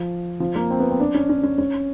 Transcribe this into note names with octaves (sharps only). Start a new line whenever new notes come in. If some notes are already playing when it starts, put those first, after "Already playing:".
Already playing: F3
F3
A#3
C4
B3
C4
D4
C#4
C#4
C#4
C#4